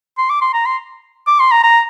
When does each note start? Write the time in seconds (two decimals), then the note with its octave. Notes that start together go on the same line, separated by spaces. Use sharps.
0.18 C6
0.29 D6
0.41 C6
0.53 A#5
0.66 C6
1.27 D6
1.40 C6
1.51 A#5
1.63 A#5